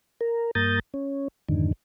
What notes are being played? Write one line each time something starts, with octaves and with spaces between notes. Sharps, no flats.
A#4
G2 A#3 A#5 D#6 G6 A6
C#4
F2 G#2 D3 D#3